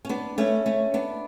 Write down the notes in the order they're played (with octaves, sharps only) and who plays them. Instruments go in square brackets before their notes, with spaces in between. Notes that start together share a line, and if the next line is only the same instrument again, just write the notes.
[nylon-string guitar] C#4
B3 D4
A3 C#4
A3 C#4
B3 D4